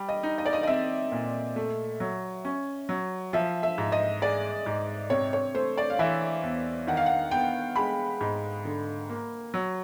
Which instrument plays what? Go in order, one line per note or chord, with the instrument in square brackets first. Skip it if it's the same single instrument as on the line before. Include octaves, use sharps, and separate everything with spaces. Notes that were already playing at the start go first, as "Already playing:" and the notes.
Already playing: [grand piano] G3
[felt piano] D#5
[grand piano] D#4
[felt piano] D#5
D5
D#5
D#5
[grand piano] C4 [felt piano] E5
[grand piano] A#2
A3
F#3
C#4
F#3
[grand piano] F3 [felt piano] E5
[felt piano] E5
[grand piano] G#2
[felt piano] D#5
[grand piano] G#3 [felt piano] D5
[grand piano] G#2
[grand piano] C3 [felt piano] C#5
[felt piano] C#5
[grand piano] A3 [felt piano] C5
[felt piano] D5
F5
[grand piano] E3 [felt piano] E5
[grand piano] E2
[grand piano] D#3 [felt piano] F#5
[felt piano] F5
F#5
[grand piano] B3 [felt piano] G5
[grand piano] G#3 [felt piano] B5
[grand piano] G#2
D3
A#3
F#3